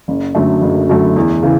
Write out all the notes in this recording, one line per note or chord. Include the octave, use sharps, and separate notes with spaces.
F#1
F#2 D3 F#3 A3
F#1
F#2 D3 F#3 A3
E2
C#3 E3